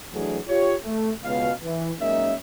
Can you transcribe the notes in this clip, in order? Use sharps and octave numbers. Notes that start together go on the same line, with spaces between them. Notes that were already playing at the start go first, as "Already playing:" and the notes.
E3 F#3 A3 D4 G#4
F4 G4 C#5
A3
C#2 B2 F5
E3
F#2 G#3 A#3 C#4 D#4 E5